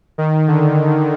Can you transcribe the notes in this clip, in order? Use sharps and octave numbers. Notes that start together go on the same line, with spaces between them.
D#3
D3